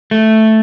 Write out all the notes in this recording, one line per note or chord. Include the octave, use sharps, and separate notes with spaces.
A3